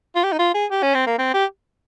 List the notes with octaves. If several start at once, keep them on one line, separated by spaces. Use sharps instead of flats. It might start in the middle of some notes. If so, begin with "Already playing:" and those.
F4
G4
D#4
F4
G#4
G4
C#4
C4
A#3
C4
G4